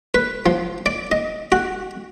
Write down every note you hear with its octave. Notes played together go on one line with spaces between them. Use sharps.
B4
F3
D5
D#5
F#4